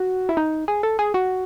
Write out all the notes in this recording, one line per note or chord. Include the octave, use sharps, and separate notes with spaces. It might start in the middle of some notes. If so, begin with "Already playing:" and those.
Already playing: F#4
E4
D#4
G#4
A4
G#4
F#4